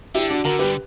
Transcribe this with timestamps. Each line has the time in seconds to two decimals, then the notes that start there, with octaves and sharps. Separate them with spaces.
0.15 D3 E4 G4
0.29 D4 F#4
0.45 D3 F#4 A#4
0.59 G3 G4 B4